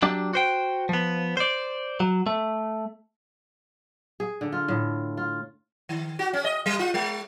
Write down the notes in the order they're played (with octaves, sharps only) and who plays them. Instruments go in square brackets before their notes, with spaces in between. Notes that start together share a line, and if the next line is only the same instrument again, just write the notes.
[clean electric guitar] F#3 D4 G4
F#4 C5 G5
F3 B3
C5 D5
F#3
A3
[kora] G#4
D3
F4
A2
F4
[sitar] D#3
F#4
C#4
D#5
G3
F4
G#3